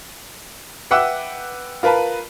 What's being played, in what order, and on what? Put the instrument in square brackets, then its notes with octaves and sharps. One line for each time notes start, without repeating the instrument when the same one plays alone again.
[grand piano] B4 E5 F#5 G5 D6 E6
F4 A#4 B4 A5 B5